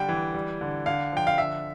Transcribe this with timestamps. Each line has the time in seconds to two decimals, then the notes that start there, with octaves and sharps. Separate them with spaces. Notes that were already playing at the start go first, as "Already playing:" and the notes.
Already playing: D3 G3 G5
0.09 E3
0.34 G3
0.61 D3
0.86 D3 F5
1.12 F3 G5
1.27 F5
1.38 D3 E5